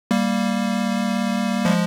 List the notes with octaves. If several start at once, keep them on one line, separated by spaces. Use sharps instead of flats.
G3 A#3
F3 G#3